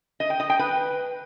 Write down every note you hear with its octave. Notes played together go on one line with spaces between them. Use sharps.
D#5
G5
D#5
G5
B4